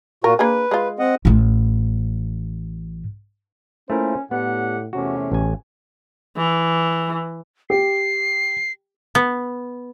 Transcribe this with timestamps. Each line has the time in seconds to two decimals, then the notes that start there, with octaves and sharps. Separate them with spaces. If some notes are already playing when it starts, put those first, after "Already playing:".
0.24 A#2 F4 F#4 A#4
0.39 A#3 D4 G#4 B4
0.71 G#3 F4
0.99 C4 D#5 F#5
1.25 A1 A2
3.90 A3 A#3 C#4 E4 F4 A#4 C5
4.31 A2 B3 D4 G4 F#5
4.93 E2 C3 A3 C#4 F#4
5.32 A1 G#5
6.37 E3
7.70 G4 C7
9.15 B3